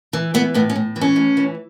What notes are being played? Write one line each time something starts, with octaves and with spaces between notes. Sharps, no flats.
E3
E3 B3
A2 B3
C#4
A2
E3
C#4
A2
E3